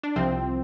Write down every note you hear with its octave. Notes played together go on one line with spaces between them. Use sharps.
D4
C2 C3 F3 C4